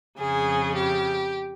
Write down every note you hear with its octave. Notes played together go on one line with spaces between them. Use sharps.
F2 C#3 G#4
G4